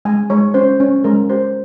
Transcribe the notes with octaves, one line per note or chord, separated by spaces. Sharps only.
G#3 G#5
G#3 C#5
C#4 C5
C#4
G#3 A#4
G4 C5